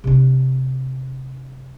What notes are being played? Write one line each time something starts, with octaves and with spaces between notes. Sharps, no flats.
C3 D4